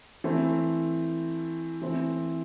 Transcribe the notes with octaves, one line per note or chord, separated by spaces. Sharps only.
E3 A3 C4
E3 A3 C4